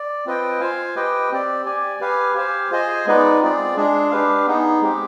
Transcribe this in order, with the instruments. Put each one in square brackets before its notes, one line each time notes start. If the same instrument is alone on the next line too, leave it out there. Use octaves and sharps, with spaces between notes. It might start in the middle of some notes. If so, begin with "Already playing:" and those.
Already playing: [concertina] D5
C4 F4 B4 D#5 G5
F4 C5 F5 G#5
G4 B4 D#5 G5
C4 G4 D5
G4 D5 G#5
G4 B4 F5 G#5
G4 C5 F5 G#5
F4 G#4 C5 D#5 G#5
G#3 B3 D#4 B4 D5
C4 F4 G#4 D5
G#3 D4 G#4
D4 G4 B4 F5
B3 D#4 G#4
G#3 C4 G4